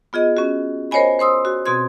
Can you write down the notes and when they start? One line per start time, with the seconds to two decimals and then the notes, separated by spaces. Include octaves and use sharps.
0.13 B3 F4 G#4 D#5
0.37 C#4 F#4
0.91 A#4 C5 C#5 D#5 G#5 B5
1.19 C5 C6 D#6 E6
1.45 F#4
1.66 B2 C4 F#4 C6 G#6